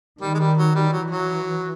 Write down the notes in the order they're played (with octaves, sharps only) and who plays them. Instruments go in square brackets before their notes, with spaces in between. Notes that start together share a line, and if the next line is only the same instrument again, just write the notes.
[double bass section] D#3 [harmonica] G3
[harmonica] G#3
G3
F#3
G3
[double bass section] E3 [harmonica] F#3
[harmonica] F#3